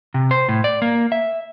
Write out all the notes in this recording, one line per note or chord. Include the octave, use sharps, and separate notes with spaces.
C3
C5
A2
D5
A#3
E5